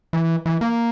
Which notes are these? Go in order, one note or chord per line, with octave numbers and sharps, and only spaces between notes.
E3
E3
A#3